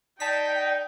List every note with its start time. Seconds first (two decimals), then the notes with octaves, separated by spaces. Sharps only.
0.20 D#4 D5 G5 A5 B6